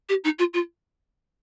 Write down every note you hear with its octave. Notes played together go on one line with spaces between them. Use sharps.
G4
D#4
F4
F4